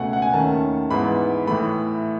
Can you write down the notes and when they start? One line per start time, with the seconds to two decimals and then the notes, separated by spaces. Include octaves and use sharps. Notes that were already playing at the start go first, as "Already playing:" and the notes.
Already playing: C#2 B2 A3 C#4 F#5 G#5
0.13 F#5
0.22 G#5
0.32 D#2 D#3 A3 C#4 A5
0.91 G#2 E3 B3 B5
1.47 A2 E3 A3 B5